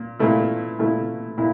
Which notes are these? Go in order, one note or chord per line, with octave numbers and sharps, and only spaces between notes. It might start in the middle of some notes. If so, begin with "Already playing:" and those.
Already playing: A#2
A#2 A3 E4
A#2 A3 E4
A#2 E4